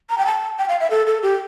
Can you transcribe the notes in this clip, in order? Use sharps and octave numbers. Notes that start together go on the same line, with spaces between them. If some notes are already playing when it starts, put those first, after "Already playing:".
A#5
G5
A5
G5
F5
E5
A4
A4
G4